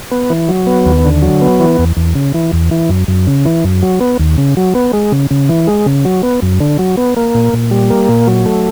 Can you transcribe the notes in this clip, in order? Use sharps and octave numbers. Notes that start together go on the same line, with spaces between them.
B3
E3
F#3
B3
D#2
D3
F#3
B3
E3
E2
E2
C#3
E3
E2
E3
F#2
F#2
C#3
E3
F#2
F#3
B3
D#2
C#3
F#3
B3
G#3
C#3
C#3
E3
G#3
C#3
F#3
B3
F#2
D3
F#3
B3
A#3
A#2
A#2
G3
A#3
A#2
F#3
A3